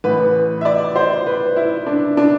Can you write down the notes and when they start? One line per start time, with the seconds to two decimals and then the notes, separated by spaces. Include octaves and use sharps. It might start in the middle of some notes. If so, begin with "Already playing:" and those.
0.04 A1 A2 E3 B4
0.61 E5
0.65 D5
0.96 C5
1.26 B4
1.56 E4
1.86 D4
2.17 D4